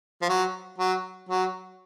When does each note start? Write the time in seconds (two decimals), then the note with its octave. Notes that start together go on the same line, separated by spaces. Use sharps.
0.22 F3
0.29 F#3
0.78 F#3
1.29 F#3